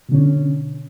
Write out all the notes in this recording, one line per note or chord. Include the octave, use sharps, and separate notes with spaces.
B2 D3 C#4